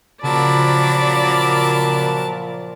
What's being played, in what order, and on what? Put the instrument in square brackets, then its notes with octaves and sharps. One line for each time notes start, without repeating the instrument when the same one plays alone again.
[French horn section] A#2 F3 [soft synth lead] C#3 [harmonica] F#3 A#4 A5 [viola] D5 B5